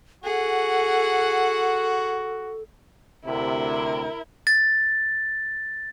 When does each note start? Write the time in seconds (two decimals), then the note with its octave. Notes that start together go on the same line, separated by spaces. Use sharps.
0.24 F#4 G#4 A4 F#5
3.25 D2 C3 E4 A#4
4.47 A6